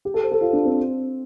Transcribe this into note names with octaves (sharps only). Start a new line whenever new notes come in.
G4
A4
C5
A4
F4
D4
C4